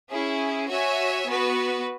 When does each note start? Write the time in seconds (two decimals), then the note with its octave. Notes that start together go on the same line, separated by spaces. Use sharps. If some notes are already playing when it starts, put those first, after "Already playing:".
0.10 C#4 E4 G#4
0.68 F#4 C#5 E5 G#5
1.27 B3 F#4 B4